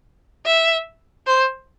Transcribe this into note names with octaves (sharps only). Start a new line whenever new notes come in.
E5
C5